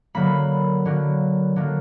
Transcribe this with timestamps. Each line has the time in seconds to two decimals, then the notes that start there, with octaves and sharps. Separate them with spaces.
0.15 D3 F#3 A#3 B5
0.85 D3 F#3 A#3
1.56 D3 F#3 A#3